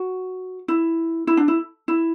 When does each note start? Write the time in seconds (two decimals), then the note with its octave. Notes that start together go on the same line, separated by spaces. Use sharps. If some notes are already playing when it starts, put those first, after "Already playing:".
Already playing: F#4
0.68 E4
1.27 E4
1.37 D4
1.48 E4
1.88 E4